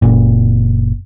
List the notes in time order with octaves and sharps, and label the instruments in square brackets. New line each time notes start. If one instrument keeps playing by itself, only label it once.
[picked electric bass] F#1 A#2